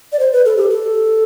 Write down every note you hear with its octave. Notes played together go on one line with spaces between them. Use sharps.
D5
C5
B4
A4
G4
A4